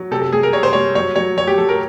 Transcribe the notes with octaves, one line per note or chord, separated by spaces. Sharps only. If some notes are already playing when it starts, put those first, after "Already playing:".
Already playing: F#3
C3 A4
A4
G3 G#4
A#4
C3 C#5
C5
G3 C#5
F#3 C#5
F#3 C#5
F#3 C#5
G4
F#3 A4
A#4